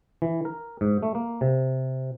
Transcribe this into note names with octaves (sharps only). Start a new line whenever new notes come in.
E3
A#4
G#2
A3
A#3
C3